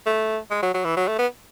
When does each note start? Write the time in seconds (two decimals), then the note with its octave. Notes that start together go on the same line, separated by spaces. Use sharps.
0.06 A3
0.50 G#3
0.62 F#3
0.74 F#3
0.84 E3
0.97 F#3
1.08 A3
1.18 B3